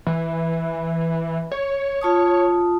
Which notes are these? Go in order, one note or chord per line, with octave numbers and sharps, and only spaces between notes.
E3
C#5
F4 A5 D#6